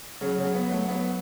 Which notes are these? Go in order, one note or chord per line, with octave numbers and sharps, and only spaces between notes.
C#3 F#3 C#4
C#3 C#4
F#3
B3
F#3 A3
F#3 B3